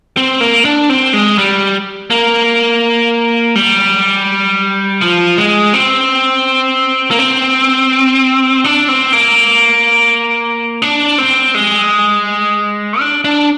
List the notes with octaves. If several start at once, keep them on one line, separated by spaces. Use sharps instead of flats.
C4
A#3
D4
C4
G#3
G3
A#3
G3
F3
G#3
C4
A#3
C4
D4
C4
A#3
D4
C4
G#3
D4
D4